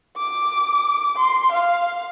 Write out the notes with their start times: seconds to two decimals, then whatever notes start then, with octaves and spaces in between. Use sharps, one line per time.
0.17 D6
1.16 C6
1.52 F5